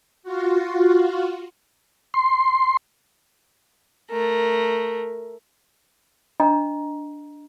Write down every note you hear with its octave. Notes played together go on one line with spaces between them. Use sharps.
F4 F#4
C6
A3 A#4
D4 D#5 A#5